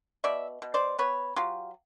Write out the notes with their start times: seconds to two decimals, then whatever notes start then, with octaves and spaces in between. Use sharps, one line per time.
0.24 B2 D5 E5
0.62 B2
0.74 C5 D5
0.98 B3 B4 C#5
1.36 F#3 F4 G4